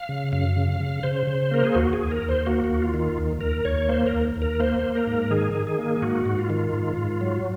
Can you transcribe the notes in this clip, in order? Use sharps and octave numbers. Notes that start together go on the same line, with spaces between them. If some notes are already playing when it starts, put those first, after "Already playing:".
Already playing: F5
C#3
F#2 F5
C#3
C#3
C#3 C5
C#3
A#3 A#4
G#4
D#2 F#4
G#4
D#2
A#4
D#2
C5
A#3 F#4
F#4
D#2
F4
D#3
F4
D#2
D#2 A#4
D#2 C#5
A#3 C5
A#4
D#2
D#2
A#4
A#3 C5
A#3
A#4
G#2
D#3 G#4
D#3
G#4
A#3
G#2 F#4
G#2
F4
D#3
G#2
G#2
F#3